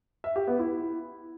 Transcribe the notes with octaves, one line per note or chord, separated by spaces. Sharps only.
E5
G4
B3
E4